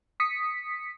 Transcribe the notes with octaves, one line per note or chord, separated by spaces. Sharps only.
D#6 B6 C#7